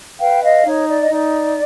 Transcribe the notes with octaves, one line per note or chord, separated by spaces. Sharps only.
B4 F5 G5
D#5 F5
D#4 C#5
D5
D#5
D#4 D5